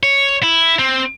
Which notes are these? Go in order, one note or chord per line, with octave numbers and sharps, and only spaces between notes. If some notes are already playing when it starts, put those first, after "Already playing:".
C#5
E4
C4